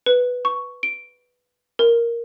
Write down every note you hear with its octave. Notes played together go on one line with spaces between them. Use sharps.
B4
C#6
D7
A#4